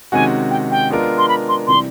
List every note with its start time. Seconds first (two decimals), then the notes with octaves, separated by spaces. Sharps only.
0.12 C3 D#3 G#3 C#4 F#4 G#5
0.50 G5
0.71 G5
0.90 G#3 B3 D4 F4 A#4
1.18 C6
1.28 B5
1.48 C6
1.67 C3 E3 G3 C6